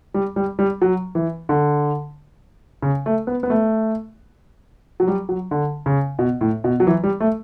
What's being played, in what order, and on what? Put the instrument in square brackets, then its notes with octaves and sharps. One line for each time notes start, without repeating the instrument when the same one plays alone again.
[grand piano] G3
G3
G3
F#3
E3
D3
C#3
A3
B3
B3
A3
F#3
G3
F#3
D3
C#3
B2
A2
B2
F#3
E3
G3
A3